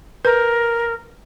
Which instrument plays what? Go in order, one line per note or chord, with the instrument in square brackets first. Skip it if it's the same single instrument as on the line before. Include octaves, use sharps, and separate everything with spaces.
[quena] A#4 [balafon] B4